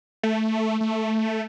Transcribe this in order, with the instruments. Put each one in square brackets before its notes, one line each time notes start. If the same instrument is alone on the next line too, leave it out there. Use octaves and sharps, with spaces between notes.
[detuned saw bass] A3
A3